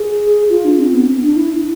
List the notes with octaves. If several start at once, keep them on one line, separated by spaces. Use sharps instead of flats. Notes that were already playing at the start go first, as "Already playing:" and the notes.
Already playing: G#4
F4
D4
C4
B3
D4
E4